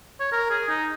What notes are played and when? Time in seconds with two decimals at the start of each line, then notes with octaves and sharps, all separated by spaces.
0.20 C#5
0.32 A#4
0.50 G#4
0.69 D#4